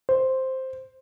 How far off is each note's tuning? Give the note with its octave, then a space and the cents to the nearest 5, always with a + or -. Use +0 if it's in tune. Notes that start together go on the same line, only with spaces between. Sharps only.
C5 +0